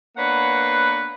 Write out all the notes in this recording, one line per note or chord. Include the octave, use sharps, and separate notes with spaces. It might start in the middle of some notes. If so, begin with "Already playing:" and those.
A#3 B3 D4 B4 C#5 F#5